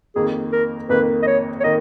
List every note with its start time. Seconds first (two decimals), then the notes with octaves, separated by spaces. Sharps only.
0.15 F2 D#3 A#3 G#4
0.52 A#4
0.89 F2 D#3 A#3 B4
1.23 D#5
1.27 C#5
1.60 C#5
1.64 D#3 A#3 D#5